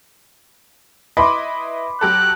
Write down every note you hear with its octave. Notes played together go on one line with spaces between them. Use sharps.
E4 B4 D#5 B5 C6 D6
F#3 G4 A4 F#6